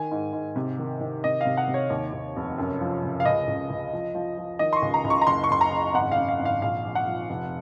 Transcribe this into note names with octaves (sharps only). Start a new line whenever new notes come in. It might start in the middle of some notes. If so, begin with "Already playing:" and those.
Already playing: D#3 G#5
G#2
G#2
C3
D#3
D#3
C3 D#5
C3 F5
F#5
C3
C#5
D#2
D#2
F1
F#2
F3
C#3
F5
C#2 D#5
C#2
C#2
F3
F3
F3
D#3 D#5
C6
C#6
C#2
A#5
C#2
C#6
A#5
F#1 C6
C#6
F#1 C6
A#5
F#1
G#1 F#5
F5
C#3
F5
G#1
F5
A#1 F5
A#1
F#5
F3
F1